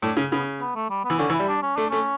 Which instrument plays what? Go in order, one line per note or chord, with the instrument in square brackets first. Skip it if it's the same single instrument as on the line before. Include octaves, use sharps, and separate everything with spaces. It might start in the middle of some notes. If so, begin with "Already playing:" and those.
[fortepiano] A2 [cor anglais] D4
[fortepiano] C#3
[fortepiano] C#3 [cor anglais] B3
[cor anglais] B3
A3
G3
B3
[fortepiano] E3
[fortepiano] D3 [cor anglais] C#4
[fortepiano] E3
[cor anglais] E4
[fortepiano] G3
[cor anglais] D4
C#4
[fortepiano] A3 [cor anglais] D4
[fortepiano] A3 [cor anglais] C#4